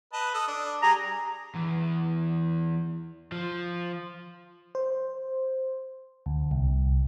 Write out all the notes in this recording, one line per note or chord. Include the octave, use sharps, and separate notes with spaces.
B4 D#5 A5
A4 D#6
D4
G3 G#4 A#5
E2
F3
C5
D2
C2